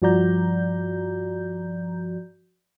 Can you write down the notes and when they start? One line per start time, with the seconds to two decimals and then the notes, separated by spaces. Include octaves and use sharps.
0.02 G2 F3 F#4 D5 A#5 G6